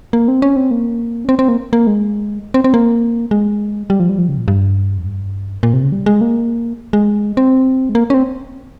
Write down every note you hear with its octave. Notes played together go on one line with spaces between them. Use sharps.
A#3
C4
C#4
C4
A#3
C#4
C4
C4
A#3
A#3
G#3
C4
C4
A#3
G#3
G3
F3
G3
F3
C#3
A#2
G2
F2
G2
A#2
C3
C#3
G3
G#3
A#3
G#3
C4
G#3
A#3
C#4
C4